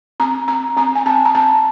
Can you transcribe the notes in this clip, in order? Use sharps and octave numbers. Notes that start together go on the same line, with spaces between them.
C4 A#5
C4 A#5
C4 A#5
G#5
C4 A5
A#5
C4 A5